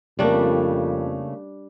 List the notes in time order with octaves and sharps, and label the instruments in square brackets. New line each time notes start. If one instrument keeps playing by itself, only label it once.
[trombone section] F2 [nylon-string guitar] C#3 A3 A#3 [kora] G3 D4